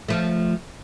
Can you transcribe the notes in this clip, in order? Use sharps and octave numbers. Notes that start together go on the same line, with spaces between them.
F3 A3